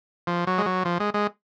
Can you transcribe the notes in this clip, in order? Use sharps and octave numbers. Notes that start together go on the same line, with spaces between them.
F3
F#3
G#3
F#3
F3
G#3
G#3